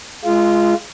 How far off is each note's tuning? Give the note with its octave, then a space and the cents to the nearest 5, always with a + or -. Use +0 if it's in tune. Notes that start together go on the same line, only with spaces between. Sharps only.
G#3 +15 F4 -20